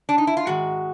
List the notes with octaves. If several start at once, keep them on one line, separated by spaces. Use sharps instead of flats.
D4
D#4
E4
F4
G#2 D#3 G#3 F#4